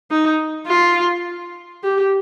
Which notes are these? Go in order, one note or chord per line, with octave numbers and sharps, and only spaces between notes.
D#4
F4
G4